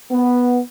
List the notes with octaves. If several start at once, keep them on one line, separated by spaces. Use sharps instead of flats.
B3